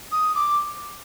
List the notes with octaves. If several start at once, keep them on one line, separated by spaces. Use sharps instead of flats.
D#6
D6